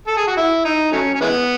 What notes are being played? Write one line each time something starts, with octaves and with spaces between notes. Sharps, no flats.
A4
G#4
F#4
E4
D#4
F#3 A3 C#4
C#4
E3 G#3 B3